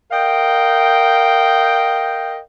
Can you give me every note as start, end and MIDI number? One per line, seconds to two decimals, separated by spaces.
0.11 2.39 70
0.11 2.39 75
0.11 2.39 77
0.11 2.39 79